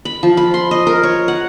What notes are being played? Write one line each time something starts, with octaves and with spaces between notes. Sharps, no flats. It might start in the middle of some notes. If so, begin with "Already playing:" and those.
B5
F3
B5
C6
D#5
A#4
C#5
F#5